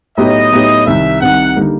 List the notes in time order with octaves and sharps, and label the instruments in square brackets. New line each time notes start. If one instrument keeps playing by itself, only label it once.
[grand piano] A2 F#3 B3 D#4 G4 [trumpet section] D#5
[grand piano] A2 F#3 B3 D#4 G4
[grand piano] C2 C3 D#3 [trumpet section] E5
[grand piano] C2 C3 D#3 [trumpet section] F#5
[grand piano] D3 G3 A#3 D#4